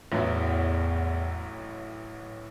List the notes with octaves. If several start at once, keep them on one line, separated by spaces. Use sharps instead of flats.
A1 E2 A2 F#3 B3 E4